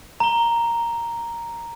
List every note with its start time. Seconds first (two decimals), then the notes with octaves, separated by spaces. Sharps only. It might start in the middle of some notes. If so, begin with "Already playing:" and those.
0.20 A#5 G7